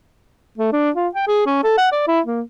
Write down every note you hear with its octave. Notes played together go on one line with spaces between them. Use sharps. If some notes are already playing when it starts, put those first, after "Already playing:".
A3
D4
F4
G5
G#4
C#4
A4
F#5
D5
E4
A#3